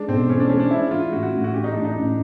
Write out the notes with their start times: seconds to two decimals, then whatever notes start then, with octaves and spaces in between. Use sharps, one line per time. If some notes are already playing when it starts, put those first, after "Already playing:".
Already playing: G#3 D4
0.08 B1 C4
0.29 E3 C#4
0.40 D4
0.49 G#3 C#4
0.60 D4
0.70 E3 E4
0.91 E3 F4
1.12 A1 F#4
1.23 F#4
1.33 A2
1.44 F#4
1.54 E3 G4
1.64 D#4
1.74 A2 D4
1.85 D#4
1.95 A1